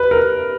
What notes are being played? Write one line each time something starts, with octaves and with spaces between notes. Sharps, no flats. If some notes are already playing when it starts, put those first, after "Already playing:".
Already playing: B4
A#4